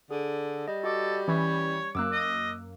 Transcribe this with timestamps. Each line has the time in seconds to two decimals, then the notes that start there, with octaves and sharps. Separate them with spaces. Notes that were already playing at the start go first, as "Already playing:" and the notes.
0.11 D3 G#4
0.68 G3 D#5
0.84 F#4 A4 D#5 D6
1.28 E3 C#4 C#5 B5
1.95 F#2 A#3 D6 E6 F#6
2.12 D#5